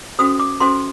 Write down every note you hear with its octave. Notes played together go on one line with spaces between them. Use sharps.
C#4 F#4 A4 C5 D#6
D6
C#4 F#4 A4 C5 C6